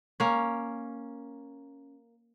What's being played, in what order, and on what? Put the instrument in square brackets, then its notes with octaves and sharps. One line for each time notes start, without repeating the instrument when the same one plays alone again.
[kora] A#3 C#4